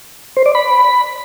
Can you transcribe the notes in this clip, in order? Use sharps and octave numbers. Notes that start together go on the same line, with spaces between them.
C5
D5
B5